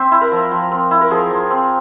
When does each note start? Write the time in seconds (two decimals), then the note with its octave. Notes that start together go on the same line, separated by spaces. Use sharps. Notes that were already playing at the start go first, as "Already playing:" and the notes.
Already playing: C4 C5 E5
0.11 E4
0.21 A#4
0.31 F3
0.51 F3
0.71 C4
0.91 E4
1.01 A#4
1.11 F3 G#4
1.30 F3
1.50 C4